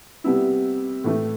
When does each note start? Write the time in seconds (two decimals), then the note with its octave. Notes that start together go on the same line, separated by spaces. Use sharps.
0.24 C3 G3 B3 E4
1.04 A2 E3 A3